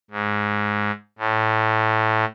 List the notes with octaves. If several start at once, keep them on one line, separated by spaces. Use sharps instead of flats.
G#2
A2